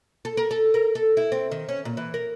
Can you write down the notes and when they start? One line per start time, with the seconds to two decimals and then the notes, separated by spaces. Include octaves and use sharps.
0.25 A4
0.37 A#4
0.51 A4
0.74 A#4
0.95 A4
1.17 E4
1.32 C4
1.52 D#3
1.69 C#4
1.85 A#2
1.97 E3
2.14 A#4